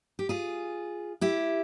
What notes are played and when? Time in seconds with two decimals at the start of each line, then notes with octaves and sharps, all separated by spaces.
0.19 G4
0.29 F4 G#4
1.21 E4 G4